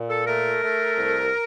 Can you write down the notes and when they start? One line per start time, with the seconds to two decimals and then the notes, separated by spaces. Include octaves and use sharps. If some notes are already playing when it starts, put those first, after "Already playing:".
Already playing: A#2
0.10 A4
0.27 A3 A#4
0.63 A3
0.98 C2